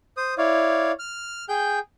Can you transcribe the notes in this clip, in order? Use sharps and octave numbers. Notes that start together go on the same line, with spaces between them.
C5 D#6
E4 C#5 D5 F5
F6
G#4 G5 G6